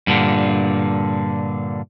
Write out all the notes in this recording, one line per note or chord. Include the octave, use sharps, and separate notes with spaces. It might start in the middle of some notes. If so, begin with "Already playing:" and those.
G2 A#2 D3